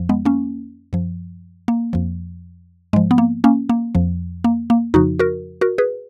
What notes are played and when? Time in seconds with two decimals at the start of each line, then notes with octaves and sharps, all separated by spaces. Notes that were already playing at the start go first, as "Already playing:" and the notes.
Already playing: F2 F3
0.09 G#3 B3
0.25 A#3 C#4
0.93 F#2 F3
1.68 A#3
1.93 F2 F3
2.93 G#2 G#3
2.96 F3
3.11 B3
3.18 A#3
3.44 A#3 C#4
3.69 A#3
3.95 F2 F3
4.44 A#3
4.70 A#3
4.94 F2 C#3 F3 D#4 F#4
5.19 F#4 A#4
5.61 F#4 A#4
5.78 G#4 B4